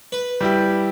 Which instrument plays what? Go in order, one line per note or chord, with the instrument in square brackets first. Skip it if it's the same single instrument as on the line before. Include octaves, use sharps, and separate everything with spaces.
[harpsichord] B4
[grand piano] G3 E4 G4